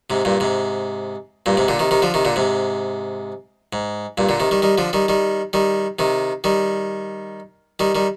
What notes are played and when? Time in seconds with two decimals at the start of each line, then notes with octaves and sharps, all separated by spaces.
0.10 G#2 C3
0.25 G2 A#2
0.40 G#2 C3
1.46 G2 A#2
1.57 G#2 C3
1.68 A#2 D3
1.79 C3 D#3
1.91 C3 D#3
2.02 D3 F3
2.14 C3 D#3
2.25 A#2 D3
2.36 G#2 C3
3.73 G#2
4.18 G2 A#2
4.29 A#2 D3
4.40 C3 D#3
4.51 D#3 G3
4.62 D#3 G3
4.78 D3 F3
4.93 D#3 G3
5.08 D#3 G3
5.53 D#3 G3
5.99 C3 D#3
6.44 D#3 G3
7.80 D#3 G3
7.95 D#3 G3